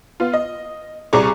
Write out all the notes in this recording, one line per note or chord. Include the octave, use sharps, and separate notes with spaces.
B3 F4
D#5
C2 G3 G#4 A#5 C#6 D6